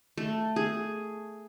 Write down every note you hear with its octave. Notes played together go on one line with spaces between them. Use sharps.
A3
G#4